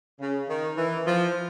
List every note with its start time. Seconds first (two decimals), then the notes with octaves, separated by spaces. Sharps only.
0.20 C#3
0.49 D#3
0.77 E3
1.06 F3